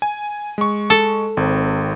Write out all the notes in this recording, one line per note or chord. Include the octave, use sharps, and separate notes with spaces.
G#5
G#3 C#6
A4
G#1 C4